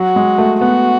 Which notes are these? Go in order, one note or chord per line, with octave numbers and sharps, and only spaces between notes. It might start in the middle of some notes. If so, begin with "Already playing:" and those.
Already playing: F#3 F#4
G#3
A3
B3 F#4